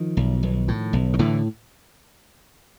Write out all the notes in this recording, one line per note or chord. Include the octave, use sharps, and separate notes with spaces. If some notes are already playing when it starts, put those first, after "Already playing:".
Already playing: D#3 F3
B1
B1
A2
B1
D#3
A2 D3 E3